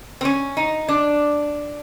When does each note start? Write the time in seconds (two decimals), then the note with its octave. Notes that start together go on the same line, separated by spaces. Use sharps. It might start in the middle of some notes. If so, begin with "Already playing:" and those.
0.21 C4
0.25 C#4
0.57 D#4
0.88 D4